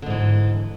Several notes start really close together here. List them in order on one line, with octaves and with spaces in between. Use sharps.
D3 G#2 E3